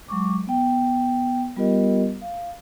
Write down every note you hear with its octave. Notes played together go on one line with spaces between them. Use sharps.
F#3 G#3 C#6 D6
B3 G5
G3 B3 F4 G4 A#4 D#5
F5